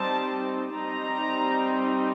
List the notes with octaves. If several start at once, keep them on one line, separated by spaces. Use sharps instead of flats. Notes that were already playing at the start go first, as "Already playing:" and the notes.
Already playing: G3 C4 D#4 A5
G3 C4 D#4 A#5